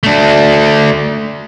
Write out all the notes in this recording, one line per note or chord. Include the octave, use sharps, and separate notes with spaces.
A3 D4